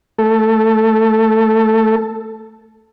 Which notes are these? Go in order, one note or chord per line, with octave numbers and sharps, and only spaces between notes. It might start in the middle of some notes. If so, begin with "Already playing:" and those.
A3 A4